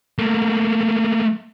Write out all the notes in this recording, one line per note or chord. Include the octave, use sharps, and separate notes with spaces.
A3 A#3